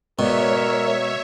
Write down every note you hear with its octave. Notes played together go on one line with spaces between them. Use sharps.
B2 G#3 A#4 C#5 D5 E5